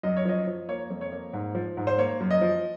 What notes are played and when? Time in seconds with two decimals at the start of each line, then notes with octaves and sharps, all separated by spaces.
0.03 F#2 D#5
0.17 C#5
0.25 F3 D#5
0.47 F3
0.68 A#3 C#5
0.90 F2
1.01 C#5
1.12 A#3
1.33 G#2
1.55 F3
1.77 G#2
1.87 C5
1.98 A#3 C#5
2.20 F#2
2.31 D#5
2.41 F3